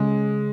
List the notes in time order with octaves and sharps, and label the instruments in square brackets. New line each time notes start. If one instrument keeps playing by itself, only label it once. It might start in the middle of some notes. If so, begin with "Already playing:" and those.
Already playing: [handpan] C#3 [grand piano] G#3